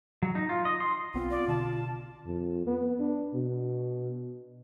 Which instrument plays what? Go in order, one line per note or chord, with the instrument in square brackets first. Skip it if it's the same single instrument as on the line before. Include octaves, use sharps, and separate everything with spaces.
[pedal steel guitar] F#3
D#4
F4
D#5
C6
[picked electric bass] B1 B3 C4 [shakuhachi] F4
[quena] D5
[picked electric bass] B2 D3 [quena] A5
[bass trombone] F2
B3
D4
B2